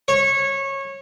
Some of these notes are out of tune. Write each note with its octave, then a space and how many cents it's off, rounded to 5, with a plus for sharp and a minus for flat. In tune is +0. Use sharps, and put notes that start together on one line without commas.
C#5 -20